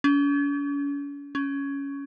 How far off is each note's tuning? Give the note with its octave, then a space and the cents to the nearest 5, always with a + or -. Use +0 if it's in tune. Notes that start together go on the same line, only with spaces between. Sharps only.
C#4 +45
C#4 +10